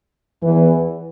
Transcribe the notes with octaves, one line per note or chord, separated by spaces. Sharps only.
E2 E3